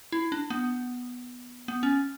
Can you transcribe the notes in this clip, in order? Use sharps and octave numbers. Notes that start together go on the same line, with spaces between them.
E4
D4
B3
B3
C#4